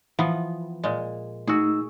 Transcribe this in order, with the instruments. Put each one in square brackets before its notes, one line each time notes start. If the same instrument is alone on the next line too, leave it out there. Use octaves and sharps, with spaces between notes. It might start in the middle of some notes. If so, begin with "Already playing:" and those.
[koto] E3 F3 B3
A#2 G#3
[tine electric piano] A3 D#4 E6 [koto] F#4 G#4